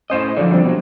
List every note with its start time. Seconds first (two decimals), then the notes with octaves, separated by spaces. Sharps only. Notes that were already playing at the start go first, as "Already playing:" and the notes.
0.10 A2 C#4 C5 D#5 G6 E7
0.37 D3 F3 F#3 D5
0.52 G3 C4 D4
0.64 B2 F#3